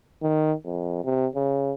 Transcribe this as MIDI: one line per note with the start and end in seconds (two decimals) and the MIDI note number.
0.22 0.54 51
0.65 1.03 41
1.04 1.27 48
1.35 1.73 49